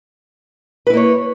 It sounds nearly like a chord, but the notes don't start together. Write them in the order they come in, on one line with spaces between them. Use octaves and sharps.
B4 E4 A#3 C#5